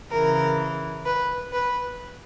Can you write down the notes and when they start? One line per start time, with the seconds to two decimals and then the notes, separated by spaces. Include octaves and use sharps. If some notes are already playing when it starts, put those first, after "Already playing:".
0.11 C#3 E3 A#4
1.05 B4
1.52 B4